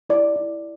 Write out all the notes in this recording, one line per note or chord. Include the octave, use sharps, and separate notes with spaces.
E4 D5
E4